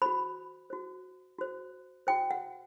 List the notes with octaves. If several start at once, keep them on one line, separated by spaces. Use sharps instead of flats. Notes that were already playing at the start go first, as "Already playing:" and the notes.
F#4 C5 B5
F#4 C5
F#4 C5
F#4 C5 G5
F#5